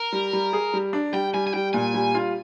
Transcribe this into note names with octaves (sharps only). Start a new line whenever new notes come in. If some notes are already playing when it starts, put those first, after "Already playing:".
Already playing: A#4
G3
G3
G#4
G3
D4
G3 G5
G3 G#5
G#5
G3 G5
A#2 G#5
G3
F4